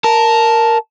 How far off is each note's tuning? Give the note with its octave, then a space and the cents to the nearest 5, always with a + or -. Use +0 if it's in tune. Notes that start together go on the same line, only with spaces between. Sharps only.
A#4 +0 A5 +0